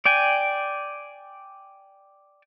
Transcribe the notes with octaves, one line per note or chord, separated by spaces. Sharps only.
D5 G5 G#5